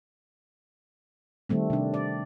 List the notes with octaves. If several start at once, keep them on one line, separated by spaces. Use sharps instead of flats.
D#3 G3 A3 C4
C3 D4
D5